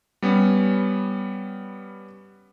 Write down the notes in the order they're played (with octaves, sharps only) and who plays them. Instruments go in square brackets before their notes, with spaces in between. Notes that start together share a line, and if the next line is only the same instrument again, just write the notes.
[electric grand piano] G3 B3 C#4